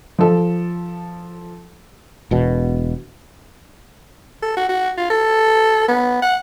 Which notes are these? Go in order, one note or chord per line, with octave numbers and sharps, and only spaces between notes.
F3 A4
E1 B2
A4
F#4
F#4
F4
A4
B3
F#5